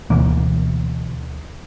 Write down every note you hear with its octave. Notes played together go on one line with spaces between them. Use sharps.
D2 B2 E3 A#3